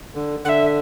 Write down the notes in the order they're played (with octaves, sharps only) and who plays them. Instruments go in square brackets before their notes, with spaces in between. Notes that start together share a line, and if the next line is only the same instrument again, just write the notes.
[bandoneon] D3
[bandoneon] D3 [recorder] F#5
[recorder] E5